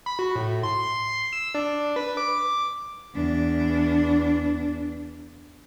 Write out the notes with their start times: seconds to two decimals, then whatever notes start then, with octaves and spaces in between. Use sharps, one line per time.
0.06 B5
0.19 F#4
0.36 A2
0.63 C6
1.33 E6
1.55 D4
1.96 B4
2.17 D6
3.15 E2 D4